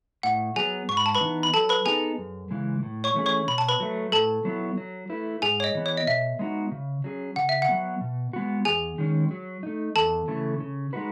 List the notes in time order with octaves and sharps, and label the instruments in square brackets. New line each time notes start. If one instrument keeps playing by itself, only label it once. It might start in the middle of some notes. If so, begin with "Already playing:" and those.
[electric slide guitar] A2 [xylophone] F#5
[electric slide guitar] F#3 B3 [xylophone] G#4 G#5
[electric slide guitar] G#2 [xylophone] C#6
[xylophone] B5
A5
B4 B5
[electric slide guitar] E3 B3 D#4
[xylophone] B5
[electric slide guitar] F#3 [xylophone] A4 A5
[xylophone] B4 B5
[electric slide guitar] B3 D#4 A4 [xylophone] G#4 G#5
[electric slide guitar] F#2
C#3 E3 G#3
A2
[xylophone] C#5 C#6
[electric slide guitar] E3 A3 C#4 G#4
[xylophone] C#5 C#6
[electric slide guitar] B2 [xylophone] B5
[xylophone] A5
B4 B5
[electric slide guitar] F#3 A3
[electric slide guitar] A2 [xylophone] A4 A5
[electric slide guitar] F#3 B3 E4
F#3
A3 E4 B4
[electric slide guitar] G#2 [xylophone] G#4 G#5
[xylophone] C#5
D#5
[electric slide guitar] E3 B3
[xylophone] C#5
D#5
[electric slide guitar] B2 [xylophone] E5
[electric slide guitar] G#3 B3 D#4 F#4
C#3
F#3 C#4 G#4
[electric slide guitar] C#3 [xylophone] F#5
[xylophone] E5
F#5
[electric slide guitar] F#3 B3
B2
G#3 B3 F#4
[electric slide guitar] E2 [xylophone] G#4 G#5
[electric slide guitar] D#3 G#3 C#4
F#3
A3 D#4
[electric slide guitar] E2 [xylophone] A4 A5
[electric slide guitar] C#3 E3 A3
C#3
G#3 D#4 F#4 B4